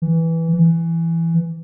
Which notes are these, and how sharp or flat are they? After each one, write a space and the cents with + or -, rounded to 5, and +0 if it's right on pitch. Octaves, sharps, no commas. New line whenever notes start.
E3 -5
E3 +10